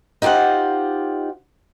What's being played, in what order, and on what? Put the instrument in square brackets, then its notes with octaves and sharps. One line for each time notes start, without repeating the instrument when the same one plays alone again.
[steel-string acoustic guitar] D#4 F4 G4 C5 F#5